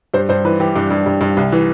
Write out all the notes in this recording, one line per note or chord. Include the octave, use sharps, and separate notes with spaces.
G2 C5
G2 C5
E3 B4
E3 G4
G2 D4
G2
G2
G2
C2
E3